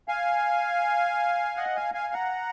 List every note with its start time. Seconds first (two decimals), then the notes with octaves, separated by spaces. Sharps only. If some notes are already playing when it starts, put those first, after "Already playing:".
0.08 F5 G#5
1.57 D#5 F#5
1.76 F5 G#5
1.94 F5 G#5
2.13 F#5 A#5